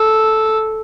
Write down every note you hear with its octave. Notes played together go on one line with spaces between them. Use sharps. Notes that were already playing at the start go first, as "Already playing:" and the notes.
Already playing: A4